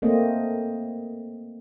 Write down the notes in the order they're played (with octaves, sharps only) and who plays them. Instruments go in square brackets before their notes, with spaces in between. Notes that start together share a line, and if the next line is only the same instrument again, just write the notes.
[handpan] A3 A#3 C4 D#5